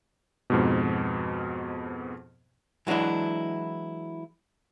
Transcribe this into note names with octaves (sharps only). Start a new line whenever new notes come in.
F2 G#2 B2
E3 F#3 G#3 D4 E4